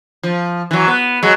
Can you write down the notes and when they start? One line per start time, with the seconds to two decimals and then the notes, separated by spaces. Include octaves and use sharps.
0.23 F3
0.71 E3 F#3
0.88 B3
1.23 F#3 G#3